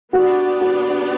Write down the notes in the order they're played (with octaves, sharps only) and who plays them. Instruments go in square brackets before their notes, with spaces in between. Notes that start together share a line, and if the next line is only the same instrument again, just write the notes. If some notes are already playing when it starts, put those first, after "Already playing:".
[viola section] B3 D4 G4 D5 [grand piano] F#4
[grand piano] F#4